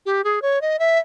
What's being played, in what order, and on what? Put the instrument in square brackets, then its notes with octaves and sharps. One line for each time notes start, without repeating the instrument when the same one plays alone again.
[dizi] G4
G#4
C#5
D#5
E5